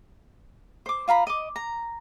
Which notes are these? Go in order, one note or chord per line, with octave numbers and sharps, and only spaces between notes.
C5 D6
F4 F5 A#5 B5
D#5 D6
A#5